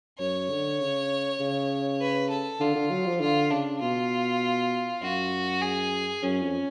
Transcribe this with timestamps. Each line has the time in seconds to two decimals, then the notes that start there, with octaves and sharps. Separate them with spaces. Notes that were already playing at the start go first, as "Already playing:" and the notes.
0.18 F#2 C#5
0.49 D3
0.80 C#3
1.40 C#3
2.01 B4
2.30 A4
2.60 D3 F4
2.75 D3
2.90 F#3
3.06 F3
3.20 D3 F4
3.50 C#3 D4
3.81 B2 F4
5.02 F#2 F#4
5.62 G#4
6.23 F#2 C#4
6.42 F2